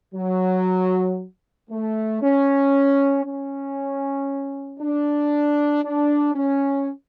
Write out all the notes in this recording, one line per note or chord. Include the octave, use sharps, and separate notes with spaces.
F#3
A3
C#4
C#4
D4
D4
C#4